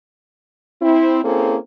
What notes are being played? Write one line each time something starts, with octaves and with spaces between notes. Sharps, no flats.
C4 E4
A#3 C4 C#4 E4 G#4 A4